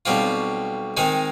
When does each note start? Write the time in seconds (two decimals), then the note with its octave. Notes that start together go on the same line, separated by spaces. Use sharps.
0.06 B1 B2 G3 C4 F4
0.97 D#3 G#3 C4 D#4